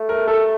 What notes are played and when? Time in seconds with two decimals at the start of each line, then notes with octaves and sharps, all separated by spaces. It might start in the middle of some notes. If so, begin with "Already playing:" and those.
Already playing: A3
0.09 A#4
0.28 A4